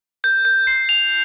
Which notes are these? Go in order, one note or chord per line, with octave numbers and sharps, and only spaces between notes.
G6
G6
C7
F7